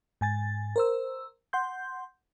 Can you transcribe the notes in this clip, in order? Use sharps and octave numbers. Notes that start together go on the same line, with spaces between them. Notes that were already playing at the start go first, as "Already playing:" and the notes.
G#2 G#5 A6
A#4 C5 E6
F#5 C6 G6